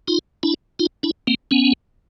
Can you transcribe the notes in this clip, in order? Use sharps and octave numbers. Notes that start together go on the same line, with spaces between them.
D#4 F4
D4 E4
D#4 F4
D4 E4
A#3 C4
B3 C#4